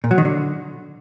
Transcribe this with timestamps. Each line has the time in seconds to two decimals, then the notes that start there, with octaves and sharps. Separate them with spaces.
0.04 A#2
0.11 F#3
0.18 D#3
0.25 D3